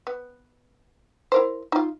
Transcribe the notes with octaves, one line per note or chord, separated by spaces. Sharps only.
B3
E4 A#4 C5
D#4 F4